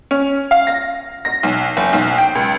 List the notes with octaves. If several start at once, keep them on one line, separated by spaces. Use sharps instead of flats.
C#4
F5
A#6
A#6
B1
F#1
B1
G5
C#2